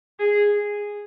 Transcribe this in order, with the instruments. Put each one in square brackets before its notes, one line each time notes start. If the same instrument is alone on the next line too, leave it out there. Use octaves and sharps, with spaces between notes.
[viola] G#4